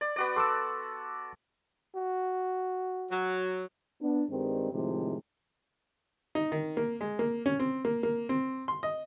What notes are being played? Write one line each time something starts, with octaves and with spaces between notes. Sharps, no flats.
D5
B3 F#4 D5
A4 C6 D6 E6
F#4
F#3
B3 D4
G2 D#3 G3 G#3 C4
A2 C3 D#3 F3 G#3
D#4
D#3
A#3
G#3
A#3
C#4
C4
A#3
A#3
C4
C6
D#5